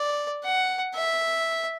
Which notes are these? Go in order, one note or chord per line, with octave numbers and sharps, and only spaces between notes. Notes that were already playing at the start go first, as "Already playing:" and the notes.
Already playing: D5
F#5
E5